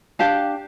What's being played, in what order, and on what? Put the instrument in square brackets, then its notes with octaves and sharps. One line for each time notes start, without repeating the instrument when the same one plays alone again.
[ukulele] D4 G4 F5 A5